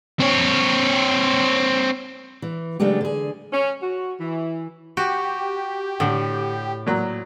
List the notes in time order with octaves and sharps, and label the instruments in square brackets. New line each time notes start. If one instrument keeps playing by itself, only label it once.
[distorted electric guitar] C4 C#5
[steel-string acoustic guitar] E3
C#3 F#3 G#3 A3 D4 G4
D3 G#4
[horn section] C#4
F#4
E3
[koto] F#4 [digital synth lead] G4
[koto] A2 [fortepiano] D3
[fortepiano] A#2 F#3